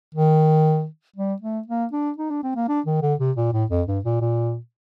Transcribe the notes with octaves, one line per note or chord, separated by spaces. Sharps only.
D#3
G3
A3
A#3
D4
D#4
D4
C4
A#3
D4
D#3
D3
C3
A#2
A2
F2
G2
A#2
A#2